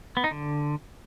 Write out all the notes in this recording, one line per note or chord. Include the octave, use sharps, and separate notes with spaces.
B3
D#4
D3